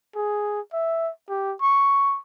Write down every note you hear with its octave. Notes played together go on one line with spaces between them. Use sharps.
G#4
E5
G4
C#6